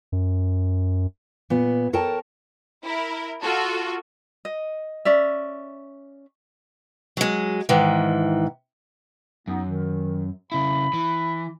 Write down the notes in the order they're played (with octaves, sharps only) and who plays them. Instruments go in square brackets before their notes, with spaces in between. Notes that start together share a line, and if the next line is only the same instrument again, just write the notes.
[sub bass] F#2
[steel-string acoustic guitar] A#2 B3
A4 A#4 C#5 G5 A5
[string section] E4 A#4
F4 F#4 A4
[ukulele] D#5
C#4 D5 E5
[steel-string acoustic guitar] F#3 G#3
G#2 D#3 E3
[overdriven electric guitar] F#2 [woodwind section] B3 D#4
[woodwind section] D#3
[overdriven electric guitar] C#3 E4 [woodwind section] B5
[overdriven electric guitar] E3